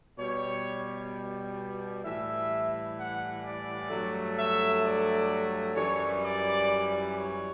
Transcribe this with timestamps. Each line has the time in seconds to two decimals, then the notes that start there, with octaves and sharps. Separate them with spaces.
0.18 B2 G3 C#5
2.04 A2 E3 G3 E5
2.97 F#5
3.44 D5
3.90 G2 F#3 A3
4.37 E5
4.83 D5
5.75 F#2 E3 G3 C#5
6.23 D5
7.15 C#5